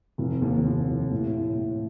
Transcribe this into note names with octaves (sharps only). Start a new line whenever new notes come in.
F1
D#2
F1
F1
A2
A2
A2